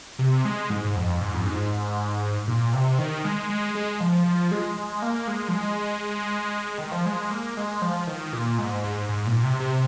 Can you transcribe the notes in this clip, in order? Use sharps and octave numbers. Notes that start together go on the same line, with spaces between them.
C3
G#3
G#2
G#2
F2
G#2
F2
G#2
A#2
C3
D#3
G#3
G#3
G#3
F3
F3
G#3
G#3
A#3
G#3
F3
G#3
D#3
F3
G#3
A#3
G#3
F3
D#3
A#2
G#2
G#2
G#2
A#2
C3
C3